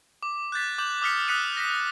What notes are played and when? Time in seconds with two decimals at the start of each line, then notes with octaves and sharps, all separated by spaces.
0.23 D6
0.52 F#6 G6 A6 B6
0.78 D6 G6 F#7
1.02 D6 D#6 F6 B6 C#7
1.28 D#6 F#6 B6 C#7 D#7
1.57 A#6 B6